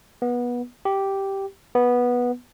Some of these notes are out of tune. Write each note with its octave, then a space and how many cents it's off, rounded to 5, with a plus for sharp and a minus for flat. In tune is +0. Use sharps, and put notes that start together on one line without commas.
B3 -20
G4 -5
B3 -10